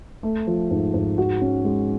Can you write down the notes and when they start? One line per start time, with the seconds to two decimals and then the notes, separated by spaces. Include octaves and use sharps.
0.23 A3
0.47 F3
0.71 G#2
0.94 G#2
1.18 F#4
1.41 C#4
1.64 G#3